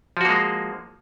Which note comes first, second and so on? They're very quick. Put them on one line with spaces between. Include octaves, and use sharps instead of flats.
F3 F#4 A#3 G#3